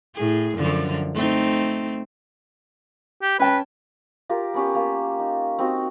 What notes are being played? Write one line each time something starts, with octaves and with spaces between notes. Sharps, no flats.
A2 G#4
F#2 D3 F3
A3 C4 D#4
G4
C#4 B4 G5 A5
F4 G4 A#4
B3 C#4 G4
A#3
D#4
C4 D#4 F#4